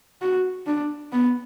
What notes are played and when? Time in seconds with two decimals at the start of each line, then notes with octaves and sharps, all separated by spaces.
0.21 F#4
0.67 D4
1.12 B3